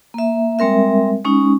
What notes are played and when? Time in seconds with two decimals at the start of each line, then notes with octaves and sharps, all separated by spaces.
0.14 A#3 E5
0.59 G3 G#3 C4 A#4 E5
1.24 G#3 C#4 D#4